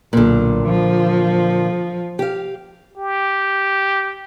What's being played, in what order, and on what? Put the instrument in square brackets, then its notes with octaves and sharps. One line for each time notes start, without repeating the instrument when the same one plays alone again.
[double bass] B1 [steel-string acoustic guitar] A#2 D3
[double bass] F3
[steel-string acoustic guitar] G4 F5
[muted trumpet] G4